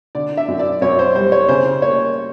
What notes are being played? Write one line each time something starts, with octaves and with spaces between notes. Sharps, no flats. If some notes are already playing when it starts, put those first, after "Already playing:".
D3 D5
E5
F#2
D5
F#2 C#5
C5
G3 C5
C#5
C#3 C5
A#3 C#5